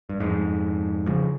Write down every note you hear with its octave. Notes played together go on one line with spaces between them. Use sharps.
G2
F2 G#2
C#3 F3